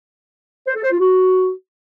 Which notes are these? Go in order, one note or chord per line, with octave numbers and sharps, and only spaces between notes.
C5
A4
C5
F4
F#4